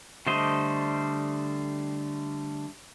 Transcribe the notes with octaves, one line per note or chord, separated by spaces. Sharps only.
D3 G3 A3 C5 D#5